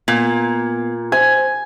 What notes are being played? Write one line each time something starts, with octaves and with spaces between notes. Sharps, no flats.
A#2 B3 G#6
C5 G#5